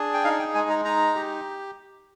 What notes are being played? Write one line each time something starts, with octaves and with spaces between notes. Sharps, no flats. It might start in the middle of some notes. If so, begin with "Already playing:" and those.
Already playing: D4 G#4
G5
D#4 F5
G5
G#3 G#5
A#5
D#4 A#5
G4